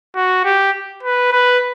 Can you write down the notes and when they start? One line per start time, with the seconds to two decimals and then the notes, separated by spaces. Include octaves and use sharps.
0.15 F#4
0.44 G4
1.03 B4
1.32 B4